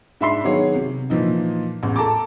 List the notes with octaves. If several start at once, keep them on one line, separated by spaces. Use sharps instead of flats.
G#2 D4 E5 B5 C6 C7
D#3 F#3 B3 G#4 C#5
C3
A#2 E3 F3 D#4
A1 E2
A4 A5 A#5 D6